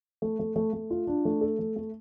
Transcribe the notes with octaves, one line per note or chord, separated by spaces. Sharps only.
A3
A3
A3
A3
F4
D4
A3
A4
A3
A3